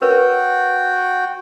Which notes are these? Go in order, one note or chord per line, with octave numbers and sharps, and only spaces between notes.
F#4 A#4 B4 C#5 G5